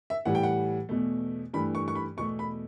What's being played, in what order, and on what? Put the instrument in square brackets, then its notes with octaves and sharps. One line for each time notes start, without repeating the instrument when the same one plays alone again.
[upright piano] E5
A2 E3 G3 F#5
G5
F#5
E2 B2 A3
G2 E3 A3 B5
C#6
C#6
B5
E2 B2 A3 C#6
B5